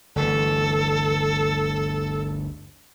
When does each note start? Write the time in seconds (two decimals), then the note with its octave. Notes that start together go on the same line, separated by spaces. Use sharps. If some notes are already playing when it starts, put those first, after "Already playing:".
0.16 G1 D2 E3 A4